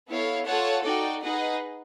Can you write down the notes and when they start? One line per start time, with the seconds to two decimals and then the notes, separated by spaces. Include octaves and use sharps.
0.08 B3 E4 A4 C#5 F5
0.46 F4 A4 C#5 F#5 A5
0.84 D#4 F#4 A4 D5 G5
1.23 D#4 G#4 B4 D#5 F#5